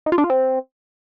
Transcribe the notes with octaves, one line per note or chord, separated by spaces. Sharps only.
D#4
F4
D4
F4
C4